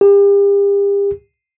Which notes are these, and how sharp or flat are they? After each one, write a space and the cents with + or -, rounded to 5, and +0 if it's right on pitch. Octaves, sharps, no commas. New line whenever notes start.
G4 +40